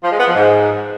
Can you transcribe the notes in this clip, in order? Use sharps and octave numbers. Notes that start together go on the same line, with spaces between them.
F3
G#3
B3
F3
G#2